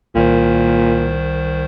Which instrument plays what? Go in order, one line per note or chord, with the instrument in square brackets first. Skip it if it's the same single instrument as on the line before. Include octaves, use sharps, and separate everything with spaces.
[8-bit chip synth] C2 D#3 C5 [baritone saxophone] A#2